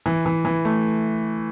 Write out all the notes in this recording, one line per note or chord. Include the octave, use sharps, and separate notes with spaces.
E3
E3
E3
A3